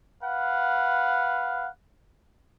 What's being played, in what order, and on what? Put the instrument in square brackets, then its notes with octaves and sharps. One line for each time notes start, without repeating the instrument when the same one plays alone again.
[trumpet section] B4 F5 F#5